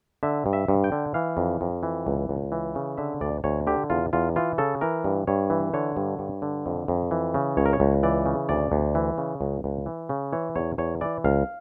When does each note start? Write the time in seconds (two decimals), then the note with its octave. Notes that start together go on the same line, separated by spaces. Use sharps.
0.23 D3 E5
0.46 G2
0.53 E5
0.68 G2
0.84 G5
0.92 D3
1.14 E3 F5
1.37 F2
1.61 F2
1.83 E3
2.07 C#2
2.29 C#2
2.52 E3
2.75 C#3
2.98 D3 E5
3.21 D2 D5
3.44 D2 C#5
3.67 D3 G4
3.90 E2 F4
4.13 E2 F4
4.36 E3 F4
4.58 C#3 A4
4.81 E3 A#4
5.04 G2
5.27 G2 C#5
5.50 E3
5.73 D3 C#5
5.97 G2
6.19 G2
6.42 D3
6.66 F2
6.88 F2
7.11 E3
7.34 C#3
7.57 C#2 C#5
7.66 A#4
7.73 C#5
7.80 C#2
8.03 E3 D5
8.26 C#3
8.49 D2 D5
8.72 D2
8.95 E3
9.18 C#3
9.41 C#2
9.64 C#2
9.86 E3
10.09 C#3
10.33 E3 C#5
10.56 E2 C#5
10.78 E2 C#5
11.01 E3 D5
11.24 C#2 F5